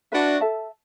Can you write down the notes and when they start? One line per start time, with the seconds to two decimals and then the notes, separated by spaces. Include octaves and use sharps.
0.12 D4 E4 F#4 B4 E5 B5
0.41 A4 E5 A5